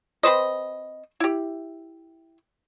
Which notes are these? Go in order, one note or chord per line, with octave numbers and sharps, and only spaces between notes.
C4 B4 C5 D#5
E4 G4